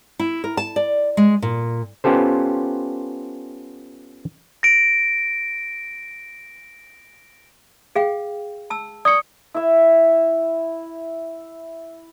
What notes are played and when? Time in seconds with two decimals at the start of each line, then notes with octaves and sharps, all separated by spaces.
0.19 E4
0.44 A#4
0.57 A5
0.76 D5
1.17 G#3
1.42 A#2
2.04 B3 C#4 F4 G4 A4 C5
4.63 A#6 D7
7.96 G#4 F5 G5
8.70 A5 E6
9.05 D5 C#6 D#6 C#7
9.54 E4 E5